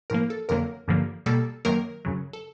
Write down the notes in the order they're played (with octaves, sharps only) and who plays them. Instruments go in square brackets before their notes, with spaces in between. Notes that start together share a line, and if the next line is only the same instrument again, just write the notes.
[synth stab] A2 F3 A#3 A#4
A4
F2 D3 F#3 A#3 A#4
G2 D3 F3 A#3
B2 G3 A#3 A4
F#2 D#3 F#3 A#3 A#4
F#2 C#3 F#3
A4